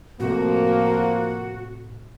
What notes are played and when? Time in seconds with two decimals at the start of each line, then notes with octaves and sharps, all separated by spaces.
0.20 A2 C3 F3 A3 A#3 F#4